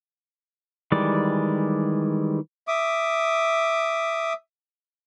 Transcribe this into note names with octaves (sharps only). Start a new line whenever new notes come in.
D#3 E3 G3 G#3 D5
E5 D6 D#6